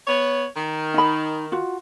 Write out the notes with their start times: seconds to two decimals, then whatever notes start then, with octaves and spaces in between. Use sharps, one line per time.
0.07 B3 C#5
0.56 D#3
0.94 D#4 B5
1.52 F4 F#4